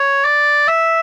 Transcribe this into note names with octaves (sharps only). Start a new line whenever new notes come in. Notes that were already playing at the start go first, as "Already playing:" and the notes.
Already playing: C#5
D5
E5